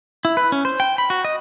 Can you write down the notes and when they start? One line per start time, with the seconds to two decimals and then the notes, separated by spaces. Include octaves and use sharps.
0.25 E4
0.37 B4
0.52 C#4
0.65 C5
0.80 G5
0.98 B5
1.10 F#4
1.25 D#5